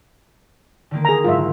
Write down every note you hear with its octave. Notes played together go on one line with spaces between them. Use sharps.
D3 D#3 A#3
G#4 A#5
F#1 G#2 F4 E5